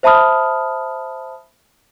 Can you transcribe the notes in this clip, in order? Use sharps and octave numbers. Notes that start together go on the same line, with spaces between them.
C5 E5 A5 B5 D#6 F6